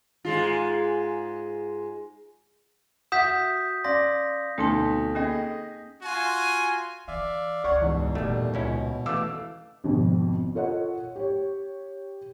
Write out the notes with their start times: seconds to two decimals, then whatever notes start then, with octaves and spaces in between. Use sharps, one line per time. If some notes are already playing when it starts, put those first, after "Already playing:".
0.25 G#2 G#3 F4
3.12 F#4 E5 F#5 D#6 G6 B6
3.84 C#4 D5 F5 C6 A#6
4.58 D2 B2 C4 C#4 D#4 A4 A5
5.15 A#3 C#4 G#4 D#5
6.02 F4 F#4 G#5
7.08 E3 D5 E5 F5
7.64 C#2 C#5 D5 F#5 C#6
7.81 E2 G#2 B2
8.15 A#2 G3 A3 A#3
8.54 C#2 C#4 E4
9.06 E3 A3 F5 D6 E6
9.84 G#1 F2 B2 D3
10.55 F4 A4 C#5 D#5 F#5
11.16 G4 C#5